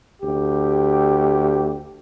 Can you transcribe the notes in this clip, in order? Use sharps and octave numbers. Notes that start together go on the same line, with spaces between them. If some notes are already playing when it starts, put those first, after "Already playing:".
D2 G4